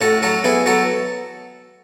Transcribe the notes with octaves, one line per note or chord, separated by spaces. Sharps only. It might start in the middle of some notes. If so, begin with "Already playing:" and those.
A2 F#4 A4
F#3 F#4 A4
B3 E4 G#4
F#3 F#4 A4